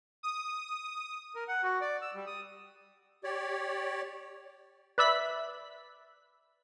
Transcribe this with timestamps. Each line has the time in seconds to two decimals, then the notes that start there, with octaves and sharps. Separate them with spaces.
0.23 D#6
1.35 A#4
1.48 F#5
1.63 F#4
1.81 D5
2.01 E6
2.15 G3
2.27 D#6
3.24 G4 C#5 D5
4.98 B4 D5 E5 B5 B6